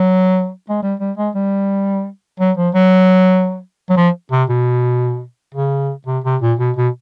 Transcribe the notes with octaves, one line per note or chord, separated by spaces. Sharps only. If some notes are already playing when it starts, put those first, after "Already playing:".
Already playing: F#3
G#3
G3
G3
G#3
G3
F#3
F3
F#3
F#3
F3
C3
B2
C#3
C3
C3
A#2
B2
B2